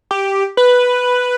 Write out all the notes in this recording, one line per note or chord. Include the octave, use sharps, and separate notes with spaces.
G4
B4